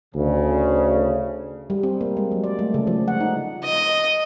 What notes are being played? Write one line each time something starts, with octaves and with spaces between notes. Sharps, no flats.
D2 C#3
G3
C4
A#3
G#3
F#3
D5
A3
C#3
F3
F#5
D#4
D#5